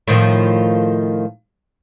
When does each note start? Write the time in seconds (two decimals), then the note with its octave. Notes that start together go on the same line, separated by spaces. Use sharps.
0.08 A2 D#3 F3